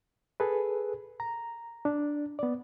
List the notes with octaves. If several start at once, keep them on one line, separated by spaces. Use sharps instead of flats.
G#4 A4 B4
A#5
D4
B3 D5